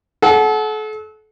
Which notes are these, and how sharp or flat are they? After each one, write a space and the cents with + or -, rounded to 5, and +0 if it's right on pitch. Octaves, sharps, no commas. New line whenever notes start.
A4 -35 F#5 +0